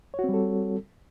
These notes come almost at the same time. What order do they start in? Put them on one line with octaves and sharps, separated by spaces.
C#5 F#4 C4 G3 A4